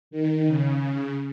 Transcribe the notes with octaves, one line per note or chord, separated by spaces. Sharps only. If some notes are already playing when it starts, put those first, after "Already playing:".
D#3
C#3